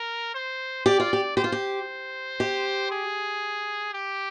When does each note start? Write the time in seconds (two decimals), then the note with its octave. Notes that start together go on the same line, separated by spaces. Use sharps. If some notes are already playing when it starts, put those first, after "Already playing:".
Already playing: A#4
0.34 C5
0.86 G4 D5
1.00 F4
1.13 G4
1.37 G4 C5
1.44 F4
1.52 G4
2.40 G4
2.91 G#4
3.94 G4